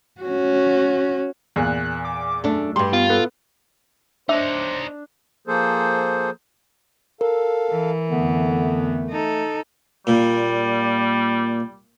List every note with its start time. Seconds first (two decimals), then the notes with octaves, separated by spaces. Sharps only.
0.21 C#4 F#4
1.56 E2 A#2 F#6
2.05 D6
2.44 F#2 A3 D4
2.76 G2 G3 G4 C6
2.93 B3 F4
3.10 B3 A4
4.29 D4 D#4 C5 C#5 E5
5.47 F3 A#3 G#4 A4 C5
7.21 A4 A#4 F5
7.71 E3
8.10 F2 D3 A3 B3
9.10 D#4 A4
10.07 A#2 G3